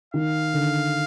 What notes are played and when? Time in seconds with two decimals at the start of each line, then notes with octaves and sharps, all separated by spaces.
0.14 D#3 F5
0.54 D3